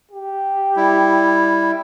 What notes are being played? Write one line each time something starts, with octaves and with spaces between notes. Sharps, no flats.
G4
G3 E4